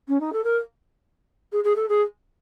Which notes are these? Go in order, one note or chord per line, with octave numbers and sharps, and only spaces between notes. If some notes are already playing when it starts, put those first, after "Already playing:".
C#4
D#4
A4
A#4
G#4
G#4
A4
G#4